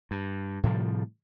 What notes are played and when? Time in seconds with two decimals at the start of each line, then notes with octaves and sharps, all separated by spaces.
0.11 G2
0.63 A2 C3 F3 G3